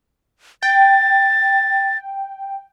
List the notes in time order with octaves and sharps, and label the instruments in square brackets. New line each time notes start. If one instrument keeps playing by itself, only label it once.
[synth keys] G5 [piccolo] A6